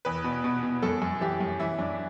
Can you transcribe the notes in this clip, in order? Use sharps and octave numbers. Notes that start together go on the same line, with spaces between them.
E2 B4
B2
B2
B2
F#2 A4
F#2
E3 G4
F#2
E3 E4
F#2 D4